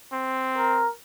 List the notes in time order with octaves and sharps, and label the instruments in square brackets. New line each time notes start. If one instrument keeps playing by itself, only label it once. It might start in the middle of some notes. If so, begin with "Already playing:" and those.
[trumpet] C4
[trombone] A#4